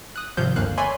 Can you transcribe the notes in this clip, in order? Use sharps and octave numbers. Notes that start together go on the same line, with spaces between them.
D#6 F#6
G#1 C3 F3 F5 G6
G1 D2 D3 A#3 F5 F#6
C#5 D5 E5 G#5 B5 C6